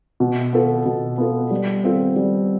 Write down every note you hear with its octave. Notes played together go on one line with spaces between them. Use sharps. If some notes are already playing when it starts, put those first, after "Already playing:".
B2
B3 F4 A4
B2
B3 F4 A4
G3
C4 F4 A4
G3